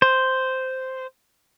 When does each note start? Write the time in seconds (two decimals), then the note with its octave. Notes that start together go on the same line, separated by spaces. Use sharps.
0.02 C5